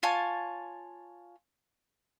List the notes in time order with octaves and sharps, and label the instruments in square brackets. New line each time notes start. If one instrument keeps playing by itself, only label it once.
[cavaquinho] F4 C#5 G#5 A5